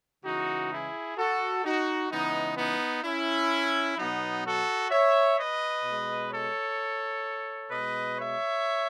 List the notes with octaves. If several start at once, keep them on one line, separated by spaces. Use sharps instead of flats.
C#3 E3 G#3 D#4 F#4
E4 G#4
F#4 A4
D#4 F#4
C#3 E3 G#3 B3 D#4
B3 D#4
C#4 E4
B2 F#3 B3 D#4
F#4 A4
C#5 E5
B4 D#5
B2 G#3
A4 C#5
B2 G#3 B4 D#5
C#5 E5